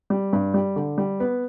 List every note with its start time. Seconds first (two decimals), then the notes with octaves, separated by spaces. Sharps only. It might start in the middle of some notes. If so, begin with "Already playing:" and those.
0.10 G3
0.33 G2
0.54 G3
0.76 D3
0.98 G3
1.20 B3